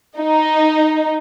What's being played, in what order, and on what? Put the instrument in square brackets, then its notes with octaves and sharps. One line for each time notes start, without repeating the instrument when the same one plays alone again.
[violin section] D#4